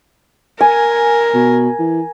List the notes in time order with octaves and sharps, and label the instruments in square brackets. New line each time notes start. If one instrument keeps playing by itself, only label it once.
[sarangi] A#4 [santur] G#5
[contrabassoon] B2
E3